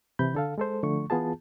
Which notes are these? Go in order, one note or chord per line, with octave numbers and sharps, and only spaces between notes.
C3 E3 E4 B5 G6
D3 A4 F5
G#3 A4 C5
D3 F3 A3 C#6
E3 B3 F4 G#4 A5